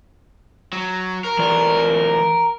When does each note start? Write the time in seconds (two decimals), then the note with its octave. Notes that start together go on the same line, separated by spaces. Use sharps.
0.73 F#3
1.24 A#4
1.39 E3 F4 D5